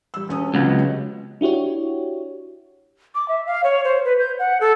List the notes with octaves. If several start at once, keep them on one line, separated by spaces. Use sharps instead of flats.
G3 E6
E1 C#4 D#6
C#2 C3 F#3 B3
D4 E4 F#4 G4 C#5
D6
E5
F5
C#5
C5
B4
G6
F#5
A4